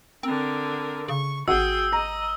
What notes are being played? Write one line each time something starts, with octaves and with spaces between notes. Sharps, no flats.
D3 C4 A#4
C#3 C#6
G#1 F#4 G#4 F#5 G5 E6
D#5 A#5